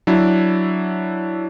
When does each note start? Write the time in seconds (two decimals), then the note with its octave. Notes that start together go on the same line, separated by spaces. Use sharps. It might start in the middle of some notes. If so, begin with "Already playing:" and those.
0.07 F#3 D4 E4